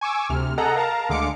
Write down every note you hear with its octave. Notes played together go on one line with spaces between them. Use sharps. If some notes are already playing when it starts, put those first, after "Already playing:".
G#5 C#6 D6 E6
D2 C3 F6
G#4 A4 D#5 F#5 A#5
A#4 F5 A5 A#5
D2 D3 G#3 F5 D6 C#7